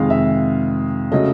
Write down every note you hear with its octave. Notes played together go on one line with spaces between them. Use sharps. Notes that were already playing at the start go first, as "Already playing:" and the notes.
Already playing: F2 C3 D#3 G#3 F5
E5
C#3 F#3 A3 D#5